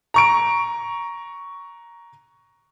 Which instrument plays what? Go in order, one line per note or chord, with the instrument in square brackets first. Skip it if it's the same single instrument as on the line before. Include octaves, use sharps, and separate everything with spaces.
[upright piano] A#5 C#6 D7